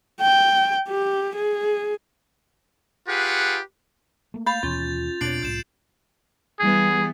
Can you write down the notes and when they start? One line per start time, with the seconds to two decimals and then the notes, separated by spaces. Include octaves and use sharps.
0.21 G5
0.88 G4
1.36 G#4
3.08 F4 G4 G#4 B4 F#5
4.34 A3 A#3
4.46 F5 B5 G6 A6 F7
4.63 D#2 B2 E3 C#4 F4
5.21 E2 B2 C4 D4 C#5 C7 D7 F#7
5.43 C2 A2 G6 E7
6.60 E3 G3 B3 G#4